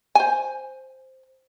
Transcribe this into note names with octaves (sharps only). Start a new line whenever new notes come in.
C5 G#5